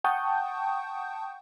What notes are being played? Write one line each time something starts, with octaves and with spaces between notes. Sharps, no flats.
F#5 G5 A5 C#6 D#6 G6